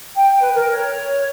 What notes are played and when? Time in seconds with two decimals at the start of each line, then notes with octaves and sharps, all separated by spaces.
0.16 G5
0.29 G5
0.41 B4
0.54 A#4
0.72 C#5